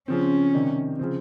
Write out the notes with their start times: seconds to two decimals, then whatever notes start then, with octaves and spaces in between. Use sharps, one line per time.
0.08 C#3 F3 C4 C#4
0.54 C3 D#3 G3
0.99 C#3 F3 C4